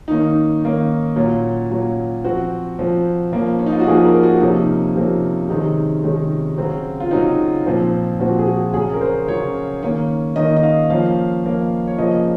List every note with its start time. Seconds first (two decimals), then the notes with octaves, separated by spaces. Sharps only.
0.08 D#3 A#3 C#4 D#4
0.63 D#3 A#3 C#4
1.16 A#2 F#3 C#4
1.70 A#2 F#3 C#4
2.24 F3 C4 F#4
2.79 F3 C4
3.32 F3 A#3 C#4
3.59 C#4
3.66 D#4
3.72 F4
3.80 F#4
3.87 F3 A#3 C#4 G#4
4.05 A#4
4.23 F#4
4.40 C3 F3 A#3 C#4 D#4
4.96 C3 F3 A#3 C#4
5.49 C3 D#3 G#3 C#4 D#4
6.03 C3 D#3 G#3 C#4
6.57 C#3 F#3 C4
7.00 F4
7.11 C#3 F#3 C4 D#4
7.66 A#2 F3 C4
8.20 A#2 F3 C4 F#4
8.39 G#4
8.47 F#4
8.74 C#3 F#3 C#4 G#4
8.94 A#4
9.01 C5
9.28 C#3 F#3 C#4 C#5
9.83 D#3 A#3 C#4
10.36 D#3 A#3 C#4 D#5
10.56 D#5
10.63 F5
10.90 F3 A#3 C#4 F5
11.44 F3 A#3 C#4
11.87 C#5
11.98 C#3 F3 A#3 C#4 D#5